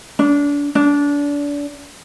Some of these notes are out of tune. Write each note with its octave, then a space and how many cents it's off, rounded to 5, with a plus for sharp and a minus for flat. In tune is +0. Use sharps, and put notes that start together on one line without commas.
D4 -30
D4 -30